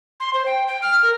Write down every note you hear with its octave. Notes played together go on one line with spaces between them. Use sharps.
C6
C5
G5
G5
F6
A#4